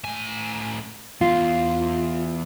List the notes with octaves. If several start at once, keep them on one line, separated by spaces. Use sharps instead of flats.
A2 G#5
E3 B3 F4